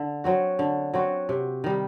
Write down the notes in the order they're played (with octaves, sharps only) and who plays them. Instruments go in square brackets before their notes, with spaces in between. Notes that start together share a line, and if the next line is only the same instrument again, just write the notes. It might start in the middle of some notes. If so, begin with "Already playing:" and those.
Already playing: [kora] D3
F#3 C4 F#4
D3
F#3 C4 F#4
C3
D#3 G3